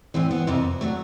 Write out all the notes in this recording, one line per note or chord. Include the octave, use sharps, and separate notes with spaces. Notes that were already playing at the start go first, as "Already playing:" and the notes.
A2 E3 C4
B3
F2 C3 F3 A#3
D3 F#3 A3